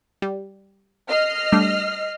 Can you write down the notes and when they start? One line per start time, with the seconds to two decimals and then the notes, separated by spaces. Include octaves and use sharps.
0.22 G3
1.09 D#5 F6 C7
1.52 G3 A3 D4